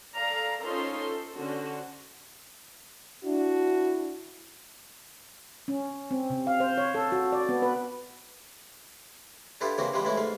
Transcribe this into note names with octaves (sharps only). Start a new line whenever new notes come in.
A4 D5 F5 A#5
C#4 D#4 F4 A4 C5 C6
A4
D3 C#4 F#4 C5
D4 E4 F#4
C#4
C4
C3
F5
C5
C#5
A4
F#4
D5
B3
B4
D4 E4 F4 G4 A4 B4
C#3 E3 A#3 C4 F#4 G4
C3 E3 F3 G3 G#3 B4
E3 G#3 A3 C#4 E4
G#2 A3 F5 B5